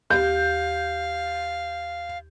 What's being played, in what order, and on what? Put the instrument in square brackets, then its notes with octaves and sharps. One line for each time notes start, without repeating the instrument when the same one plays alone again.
[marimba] D#2 G4 [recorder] F5 [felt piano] G6